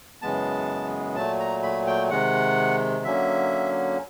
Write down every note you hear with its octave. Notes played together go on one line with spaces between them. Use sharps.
F#2 C#3 E3 G#3 B3 A5
A#2 F#3 A3 A5
A#5
B5
G5
C3 D#3 G#3 F#5
D3 F#3 A#3 C#4 E5